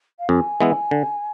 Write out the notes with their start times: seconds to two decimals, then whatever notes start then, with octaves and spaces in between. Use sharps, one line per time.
0.19 F5
0.29 F2 G#5
0.61 E3 G#3 B3 E4
0.91 D3